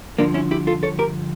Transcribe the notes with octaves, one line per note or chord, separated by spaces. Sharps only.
G2 D3 F3 A#3 D4
C#4 E4
E4 G4
F4 A4
A4 C#5
G4 A#4